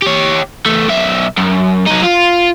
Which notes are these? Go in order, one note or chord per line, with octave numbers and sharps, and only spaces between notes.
G4 C#5
E2 A3
B1 E5
F#2
F#3 D#4
F4